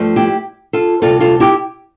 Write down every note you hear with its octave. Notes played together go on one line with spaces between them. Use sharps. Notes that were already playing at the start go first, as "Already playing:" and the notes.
Already playing: G2 F3 A3
E4 G4
F4 A4
D2 C3 G3 F4 A4
F4 A4
E4 G4